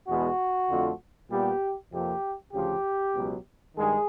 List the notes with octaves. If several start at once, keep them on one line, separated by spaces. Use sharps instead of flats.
E2 B2 G#3 B3 F#4
F2 D3 F3 A3
A#2 G3 B3 G4
F2 C3 F3 A#3 G4
D2 C#3 F3 G4
C#2 B2 F#3
G2 D#3 G#3 G#4